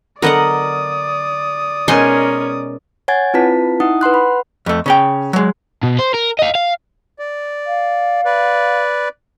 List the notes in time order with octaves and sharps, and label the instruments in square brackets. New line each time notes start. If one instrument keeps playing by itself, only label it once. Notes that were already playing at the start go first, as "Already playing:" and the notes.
[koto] D3 F#3 B3 [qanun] A#4 D#5 F#5 [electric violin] D5 D#6
[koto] B2 G#3 D#4 [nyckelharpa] C#4 A#4 [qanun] D#5 G#5 C6
[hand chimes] C#5 F#5 G#5 G#6 A6
C4 E4 F4 B4 A5 B6
D#4 E4 F#5 D#6
B4 F#5 C6 F#6
B5
[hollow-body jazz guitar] F2 A3
C#3 C#4 G5
F#3 G#3
[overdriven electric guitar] B2
C5
A#4
D#5 F5
F5
[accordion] D5
[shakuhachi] F5
[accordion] B4 D5